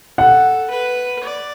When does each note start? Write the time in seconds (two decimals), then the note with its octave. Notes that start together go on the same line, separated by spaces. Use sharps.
0.18 A4 F#5
0.70 B4
1.23 D5